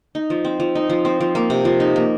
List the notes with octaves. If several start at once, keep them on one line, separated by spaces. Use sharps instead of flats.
D#4
F3
C4
F3
D#4
F3
C4
F3
A#3
C3
F3
D#4
A#3